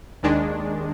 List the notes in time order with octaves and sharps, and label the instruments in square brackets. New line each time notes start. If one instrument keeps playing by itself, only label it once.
[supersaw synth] D#2 D#3 G#3 D4